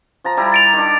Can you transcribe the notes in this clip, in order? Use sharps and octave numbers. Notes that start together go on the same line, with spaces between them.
F3 A5 A#5
G3 E4 A#5
A6 D7 F7
D#3 D4